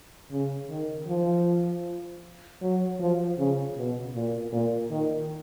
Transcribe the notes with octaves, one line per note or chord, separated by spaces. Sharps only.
C#3
D#3
F3
F#3
F3
C#3
B2
A#2
A#2
D#3